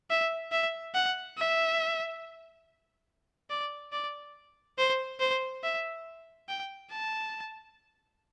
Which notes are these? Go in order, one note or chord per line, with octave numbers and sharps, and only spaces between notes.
E5
E5
F#5
E5
D5
D5
C5
C5
E5
G5
A5